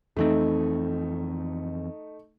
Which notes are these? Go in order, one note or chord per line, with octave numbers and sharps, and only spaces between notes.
F2 E3 A3 C4 D#4